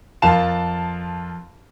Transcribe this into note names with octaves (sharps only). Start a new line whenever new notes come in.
F2 F4 A#4 F5 A5 E7